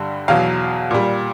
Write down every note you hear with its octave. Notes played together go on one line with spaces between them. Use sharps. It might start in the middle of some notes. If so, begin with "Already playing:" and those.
Already playing: G2 D3 G3
E2 B2 F#3 F5
A#2 G3